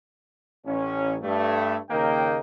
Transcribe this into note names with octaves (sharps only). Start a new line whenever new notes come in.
A1 C#4
G2 A3
D#2 C#3 A#3 A#4 D#5 G5